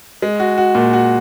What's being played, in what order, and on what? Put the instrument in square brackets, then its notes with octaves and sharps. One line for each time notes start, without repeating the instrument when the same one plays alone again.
[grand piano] G#3
F#4
F#4
A#2
F#4